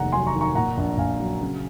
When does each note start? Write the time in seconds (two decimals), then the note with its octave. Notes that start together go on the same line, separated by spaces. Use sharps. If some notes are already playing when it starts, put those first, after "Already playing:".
Already playing: F1 D#2 F#5 A#5
0.12 F#3 G#5 C6
0.27 A#5 C#6
0.34 D#3
0.41 A#5 C#6
0.55 A#2 F#5 A#5
0.77 A#1 F#5
0.98 A#1 F5 G#5
1.19 F#3
1.41 C#3